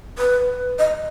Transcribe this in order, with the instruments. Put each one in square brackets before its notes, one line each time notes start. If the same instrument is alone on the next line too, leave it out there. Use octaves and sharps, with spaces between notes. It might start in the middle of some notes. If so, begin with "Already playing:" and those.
[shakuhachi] B4
D#5